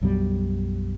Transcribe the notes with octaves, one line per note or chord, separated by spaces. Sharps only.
B1 F#2 B2 G3